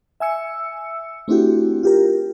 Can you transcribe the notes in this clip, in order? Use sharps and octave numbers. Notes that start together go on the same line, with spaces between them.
E5 G#5 E6 C#7
A3 C4 D4 E4 F#4 G4
F4 G4 A#4